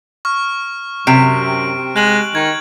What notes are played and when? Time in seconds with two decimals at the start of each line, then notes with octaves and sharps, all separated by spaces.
0.25 C#6 F6
1.07 F#2 C3 D7
1.96 G#3 F#6 F#7
2.35 D#3 G#6